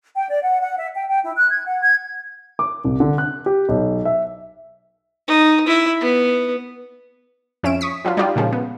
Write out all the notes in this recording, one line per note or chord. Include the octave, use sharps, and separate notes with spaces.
G5
D5
F#5
F#5
E5
G5
G5
E4
F#6
G#6
F#5
G#6
D6
C2
D3
F#6
G4
B1
E5
D#4
E4
B3
F2 C#4 E5 D7 E7
C#6 D#6 B6
F3 F#3 D4 F4
G3 D4 D#4 F4 G4 D5
A#2 C#3 F3 G#3
B3